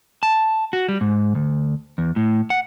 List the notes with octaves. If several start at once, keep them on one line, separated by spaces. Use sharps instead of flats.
A5
F#4
G3
G#2
D2
E2
A2
F#5